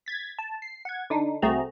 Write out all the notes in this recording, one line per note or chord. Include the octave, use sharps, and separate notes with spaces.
G#6 A6 B6
A5
C7
F#5 G#6
D3 D4 D#4
C2 A3 C4 F#4 G#4 A#5